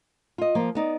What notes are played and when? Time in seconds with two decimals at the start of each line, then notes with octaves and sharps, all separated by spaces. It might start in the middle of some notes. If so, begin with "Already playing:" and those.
0.38 F4 D#5
0.55 F3 A#3
0.75 B3 D#4 D5